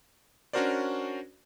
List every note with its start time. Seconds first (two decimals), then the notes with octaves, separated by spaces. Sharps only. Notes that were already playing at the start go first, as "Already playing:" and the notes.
0.53 C#4 D4 F#4 A#4 C5 D5